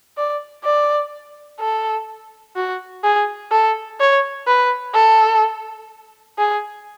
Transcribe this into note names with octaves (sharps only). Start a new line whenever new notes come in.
D5
D5
A4
F#4
G#4
A4
C#5
B4
A4
G#4